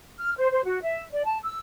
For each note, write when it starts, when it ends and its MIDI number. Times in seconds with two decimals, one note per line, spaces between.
0.19 0.31 89
0.37 0.48 72
0.52 0.61 72
0.65 0.78 66
0.82 1.01 76
1.11 1.23 74
1.24 1.37 81
1.43 1.59 88